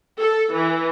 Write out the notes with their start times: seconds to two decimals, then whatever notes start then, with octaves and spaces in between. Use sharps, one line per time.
0.20 A4
0.52 E3